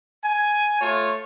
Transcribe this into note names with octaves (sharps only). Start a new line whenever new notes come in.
G#5
A3 F4 C#5